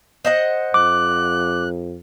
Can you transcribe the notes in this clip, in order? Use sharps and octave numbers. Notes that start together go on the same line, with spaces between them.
C5 D#5 F#5
F2 D6 F#6